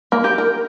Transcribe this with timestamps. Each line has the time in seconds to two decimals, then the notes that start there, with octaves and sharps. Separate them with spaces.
0.12 A#3
0.24 G4
0.38 A#4